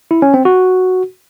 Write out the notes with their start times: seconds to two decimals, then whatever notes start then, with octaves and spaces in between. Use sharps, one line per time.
0.11 E4
0.22 C#4
0.34 C4
0.45 F#4